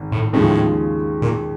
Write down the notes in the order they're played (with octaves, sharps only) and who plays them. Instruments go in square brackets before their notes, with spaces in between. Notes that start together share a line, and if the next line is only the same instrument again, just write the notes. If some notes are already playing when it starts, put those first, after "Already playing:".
Already playing: [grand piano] G#1
[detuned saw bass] A2
[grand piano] D#2 C#3 F3 G#3 [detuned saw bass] A2
[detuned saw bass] A#2